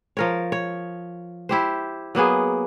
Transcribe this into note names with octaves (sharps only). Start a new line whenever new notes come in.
F3 A#4 C#5
C#5
E4 G4 C5
F#3 A#3 B3 G#4